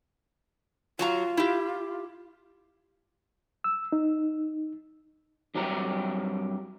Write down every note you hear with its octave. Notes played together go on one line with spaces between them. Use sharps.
F#3 F4 F#4 A#5
E4 G4
E6
D#4
G2 F#3 C4 G4 A#5